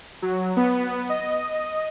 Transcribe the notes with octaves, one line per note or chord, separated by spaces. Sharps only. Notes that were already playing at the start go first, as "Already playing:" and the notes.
F#3
B3
D#5